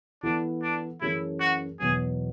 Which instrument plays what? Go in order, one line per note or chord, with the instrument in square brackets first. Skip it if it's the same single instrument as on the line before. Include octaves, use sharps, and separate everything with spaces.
[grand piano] E3 B3 E4 A4 [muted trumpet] D4
[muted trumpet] D4
[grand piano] F#2 E3 A3 C#4 G#4 [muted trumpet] E4
[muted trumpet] F#4
[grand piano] E2 B2 F#3 B3 [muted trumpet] G#4